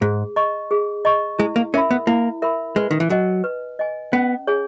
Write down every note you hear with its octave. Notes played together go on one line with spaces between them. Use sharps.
G#2 G#4
D#5 A#5 C#6
G#4
D#5 A#5 C#6
G#3 E4
A#3
C#4 A#4 E5 B5
B3
A#3 E4
A#4 E5 B5
G#3 B4
D#3
E3
F#3 D#5 G#5
B4
D#5 G#5
B3 C#4
G#4 C#5 G#5